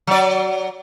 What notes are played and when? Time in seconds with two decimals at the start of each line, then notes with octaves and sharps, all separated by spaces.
0.07 F#3 D5